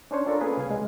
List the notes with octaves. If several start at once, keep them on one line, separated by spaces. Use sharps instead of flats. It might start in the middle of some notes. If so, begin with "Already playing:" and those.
C#4 D4 C5 C#5
D4 F4 A4 A#4
A#3 C#4 G#4 B4
C2 C#3 F5 G#5
G#3